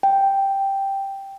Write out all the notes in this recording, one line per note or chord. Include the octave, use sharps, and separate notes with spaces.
G5